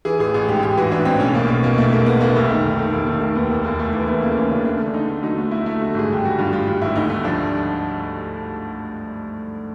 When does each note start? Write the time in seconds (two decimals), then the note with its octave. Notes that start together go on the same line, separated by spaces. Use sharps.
0.05 E3 G#4
0.20 A1 G#4
0.34 A1 G#4
0.48 G#2 G4
0.63 A1 G4
0.77 E3 F#4
0.92 E3 D4
1.05 A1 C4
1.20 B1 C#4
1.34 B1 A#3
1.48 B2 A#3
1.64 B2 A#3
1.77 B1 A3
1.93 G#3 A#3
2.06 G#3 B3
2.20 B1 A#3
2.36 F1 A3
2.50 D#3
2.64 F1
2.79 D#3
2.93 F1 A#3
3.07 F1 A3
3.22 D#3 A#3
3.35 D#2 B3
3.50 F1 A#3
3.65 E2 A#3
3.79 E2 A3
3.93 E3 A#3
4.08 E3 A3
4.22 C#3 A#3
4.36 E3 C#4
4.51 C#3 D4
4.65 A3 D4
4.79 D3
4.94 D3 D#4
5.09 A3
5.23 F#3 D#4
5.38 A3
5.51 A3 E4
5.66 A3
5.80 D3 F#4
5.94 G#1 G#4
6.09 G2 G4
6.24 G3 F#4
6.38 G2 F4
6.53 G3 F4
6.67 G2
6.81 G#1 E4
6.96 D2 D#4
7.10 A3
7.24 F3 D4